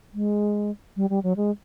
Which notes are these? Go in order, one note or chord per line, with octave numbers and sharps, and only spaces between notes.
G#3
G3
G3
F#3
G#3